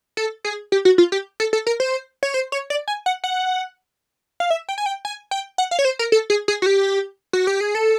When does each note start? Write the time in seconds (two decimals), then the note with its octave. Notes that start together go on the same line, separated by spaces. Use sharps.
0.17 A4
0.45 G#4
0.72 G4
0.85 F#4
0.98 F4
1.12 G4
1.40 A4
1.53 A4
1.67 A#4
1.80 C5
2.23 C#5
2.34 C5
2.52 C#5
2.70 D5
2.88 G#5
3.06 F#5
3.24 F#5
4.40 F5
4.50 E5
4.69 G5
4.78 G#5
4.86 G5
5.05 G#5
5.31 G5
5.58 F#5
5.71 F5
5.79 C#5
5.85 C5
5.99 A#4
6.12 A4
6.30 G#4
6.48 G#4
6.62 F#4
6.66 G4
7.33 F#4
7.47 G4
7.61 G#4
7.75 A4